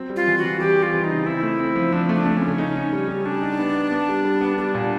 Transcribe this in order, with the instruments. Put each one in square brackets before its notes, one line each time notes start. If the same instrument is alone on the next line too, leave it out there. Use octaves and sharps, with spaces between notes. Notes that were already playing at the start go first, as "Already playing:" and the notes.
Already playing: [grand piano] F#3 C4
G3
[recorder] F4
[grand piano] E3
[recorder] F#4
[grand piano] E3
[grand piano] G3 [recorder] G4
[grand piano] G3
[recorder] F4
[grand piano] E3
[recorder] D#4
[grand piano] C#3
[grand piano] C4 [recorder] E4
[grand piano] A3
C4
F3
[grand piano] F3 [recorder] D4
[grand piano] A3 [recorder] D4
[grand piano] A3
[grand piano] C#3 [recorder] C#4
[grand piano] D#4
D#4
G3
G3
[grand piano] G3 [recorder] D4
[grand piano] D#4
B3
B3
B3
G3
G3
B3
[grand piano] G3 [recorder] D4
[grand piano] A#2